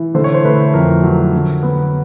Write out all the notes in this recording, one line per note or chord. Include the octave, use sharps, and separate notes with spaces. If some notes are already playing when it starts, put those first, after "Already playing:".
Already playing: E3
D3 C5
C#5
C5
A3 B4
F2 A#4
F#3
D3
B3